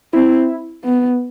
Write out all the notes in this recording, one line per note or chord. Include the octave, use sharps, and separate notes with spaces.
C4 E4
B3